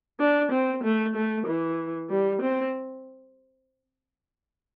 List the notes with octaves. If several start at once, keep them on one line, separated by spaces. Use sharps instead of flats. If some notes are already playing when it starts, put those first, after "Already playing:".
D4
C4
A3
A3
E3
G3
C4